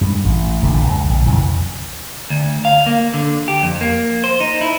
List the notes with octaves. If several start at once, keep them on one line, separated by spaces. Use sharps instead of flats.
G2 G#3
A1
E1 A#1 A#2 D3
C#2 G#3
A#1
B1 F2 C#3 E3
D2
F5
A#3
D3
G4
F2
A#3
C5
D#4
E4